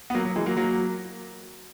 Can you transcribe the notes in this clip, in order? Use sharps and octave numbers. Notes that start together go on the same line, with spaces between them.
B3
F#3 A#3
F#3
E3 G#3
F#3 A#3
F#3 A#3